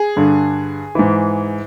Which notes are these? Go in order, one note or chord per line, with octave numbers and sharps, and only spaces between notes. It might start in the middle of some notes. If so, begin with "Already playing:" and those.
Already playing: G#4
G2 D3
G#2 E3